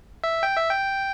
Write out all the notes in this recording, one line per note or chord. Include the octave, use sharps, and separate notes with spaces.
E5
G5
E5
G5